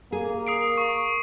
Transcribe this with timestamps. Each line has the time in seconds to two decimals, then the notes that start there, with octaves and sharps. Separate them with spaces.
0.12 A#3 G#4
0.47 D#6 C7 D7
0.78 C#6